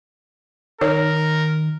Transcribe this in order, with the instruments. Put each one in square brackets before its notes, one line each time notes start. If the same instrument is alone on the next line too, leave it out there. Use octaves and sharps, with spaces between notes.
[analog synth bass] D#3 [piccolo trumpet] A#4 [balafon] C#5